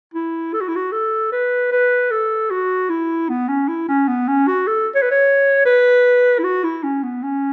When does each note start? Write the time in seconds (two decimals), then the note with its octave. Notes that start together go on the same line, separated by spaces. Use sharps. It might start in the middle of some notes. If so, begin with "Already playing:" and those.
0.14 E4
0.53 A4
0.61 F#4
0.68 E4
0.76 F#4
0.92 A4
1.32 B4
1.72 B4
2.11 A4
2.50 F#4
2.90 E4
3.29 B3
3.49 C#4
3.68 E4
3.88 C#4
4.08 B3
4.28 C#4
4.47 F#4
4.67 A4
4.95 C#5
5.02 B4
5.11 C#5
5.65 B4
6.39 E4
6.44 F#4
6.64 E4
6.83 C#4
7.03 B3
7.23 C#4